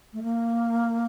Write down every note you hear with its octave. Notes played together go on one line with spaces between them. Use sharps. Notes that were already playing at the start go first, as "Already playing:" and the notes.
A3
A#3